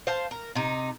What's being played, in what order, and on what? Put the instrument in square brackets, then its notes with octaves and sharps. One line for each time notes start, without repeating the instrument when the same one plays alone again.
[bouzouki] C5 F5 A5
A#4
C3 D#4